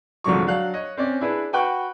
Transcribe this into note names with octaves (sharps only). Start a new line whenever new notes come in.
C2 G#2 D3 F3 F#3 C#6
F#3 D4 F5 F#6
C#5 D#5
C4 C#4 D5
D4 E4 G#4 B4
F#4 B4 G5 C#6 F#6